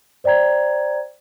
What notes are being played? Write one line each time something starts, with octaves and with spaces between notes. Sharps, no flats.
C5 D5 G5 A#5 G#6